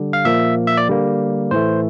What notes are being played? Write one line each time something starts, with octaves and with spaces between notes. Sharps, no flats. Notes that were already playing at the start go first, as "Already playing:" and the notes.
Already playing: D3 G3
F5
A#2 F3 A#3 E5
E5
D5
D3 G3 A#3
A2 E3 A3 C5